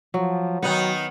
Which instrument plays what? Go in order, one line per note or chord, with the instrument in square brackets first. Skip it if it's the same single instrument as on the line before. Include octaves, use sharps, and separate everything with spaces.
[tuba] F3 [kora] F#3
[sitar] D#3 D#4 [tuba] F#3 [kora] B3 F#5